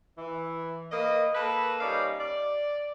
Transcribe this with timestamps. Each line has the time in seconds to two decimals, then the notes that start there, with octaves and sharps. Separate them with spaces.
0.18 E3
0.92 A#3 B4 D#5
1.35 A#3 A4 B4
1.81 G3 C#4 D#4 D5 F5
2.20 D5